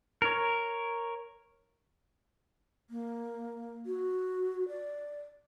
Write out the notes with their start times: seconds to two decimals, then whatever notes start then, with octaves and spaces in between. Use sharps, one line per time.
0.22 A#4 C#5
2.90 A#3
3.86 F#4
4.69 D5